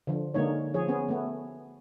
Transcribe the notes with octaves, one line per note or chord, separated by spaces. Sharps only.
D3 F3
D3 G#3 A#3 D#4 C#5
F3 G#4 C#5
B3 C#4 G#4
A3 B3